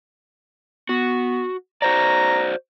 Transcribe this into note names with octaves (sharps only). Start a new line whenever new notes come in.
B3 F#4
F#4 C5 D5 A#5